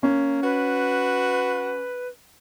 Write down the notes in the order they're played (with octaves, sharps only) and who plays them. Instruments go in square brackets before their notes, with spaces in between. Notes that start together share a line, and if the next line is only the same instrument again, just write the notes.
[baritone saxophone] A#3 [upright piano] C#4
[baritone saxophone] F#4 [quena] B4